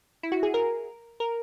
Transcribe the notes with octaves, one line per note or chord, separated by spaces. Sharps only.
E4
F#4
G#4
A#4
A#4